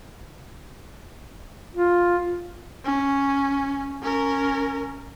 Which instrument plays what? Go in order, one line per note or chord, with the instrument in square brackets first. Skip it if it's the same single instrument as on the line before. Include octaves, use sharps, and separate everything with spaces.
[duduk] F4
[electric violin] C#4
C#4 A#4